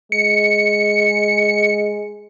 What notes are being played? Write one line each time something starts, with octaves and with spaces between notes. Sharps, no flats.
G#3 C#7